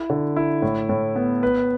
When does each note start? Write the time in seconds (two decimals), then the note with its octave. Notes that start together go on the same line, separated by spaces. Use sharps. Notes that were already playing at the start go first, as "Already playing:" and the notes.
Already playing: E4
0.10 D3
0.36 E4
0.62 A2
0.89 A2
1.16 B3
1.43 B4